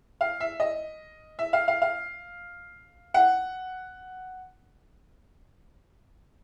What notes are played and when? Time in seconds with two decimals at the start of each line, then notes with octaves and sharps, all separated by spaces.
0.21 F5
0.40 E5
0.60 D#5
1.39 E5
1.53 F5
1.68 F5
1.82 F5
3.14 F#5